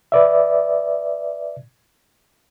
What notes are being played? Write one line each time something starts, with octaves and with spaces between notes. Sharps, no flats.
B4 D5 E5